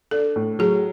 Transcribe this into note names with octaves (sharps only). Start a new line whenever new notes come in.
D4 A4
A2
F#3 G#4